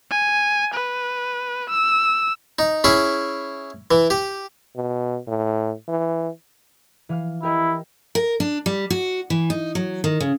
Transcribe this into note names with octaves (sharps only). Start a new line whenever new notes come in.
G#5
B4
E6
D#4
C#4 E4 G#4
E3
G4
B2
A2
E3
E3 F5 F6
E4 G4 A#4 D#5
A#4
D4
G3
F#4
E3
D#4
F#3
D#3
C#3